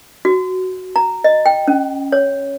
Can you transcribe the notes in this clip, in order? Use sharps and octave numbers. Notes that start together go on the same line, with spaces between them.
F#4
A#5
D#5
G5
C#4
C#5